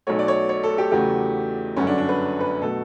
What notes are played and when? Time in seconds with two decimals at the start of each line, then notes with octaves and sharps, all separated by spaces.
0.07 B1 B2 F#3 A3 C#5
0.19 D5
0.28 C#5
0.49 C#5
0.63 A4
0.78 G4
0.92 E2 C#3 F#3 A3 G4
1.77 G1 F#2 D3 F#3 C#4
1.87 D4
1.98 D4
2.09 B4
2.41 B4
2.61 B2 F#3 A3 A4